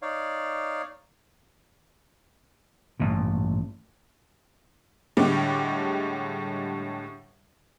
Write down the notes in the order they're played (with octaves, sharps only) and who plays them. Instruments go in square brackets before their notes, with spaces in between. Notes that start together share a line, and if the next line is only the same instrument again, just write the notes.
[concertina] D#4 C#5 D5 F5
[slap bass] A1 G2 A#2
[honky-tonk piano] A2 D3 G3 G#3 D6